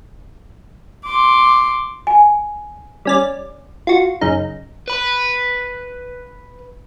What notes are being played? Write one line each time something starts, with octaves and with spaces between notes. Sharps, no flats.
C6 D6
G#5
G3 C#4 D5
F4 F#4
F#2 C#3 D#4
B4 B5